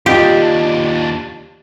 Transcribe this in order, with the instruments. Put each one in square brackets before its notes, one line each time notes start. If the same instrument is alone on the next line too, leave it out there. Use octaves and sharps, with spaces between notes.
[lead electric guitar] D#2 D4 [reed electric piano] F4 D#5 [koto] G4